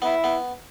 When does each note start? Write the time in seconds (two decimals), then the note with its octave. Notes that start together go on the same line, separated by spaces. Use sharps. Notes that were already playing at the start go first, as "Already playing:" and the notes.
0.02 B3 E4
0.24 B3